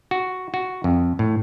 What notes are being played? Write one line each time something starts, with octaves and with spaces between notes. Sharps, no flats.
F#4
F#4
F2
A2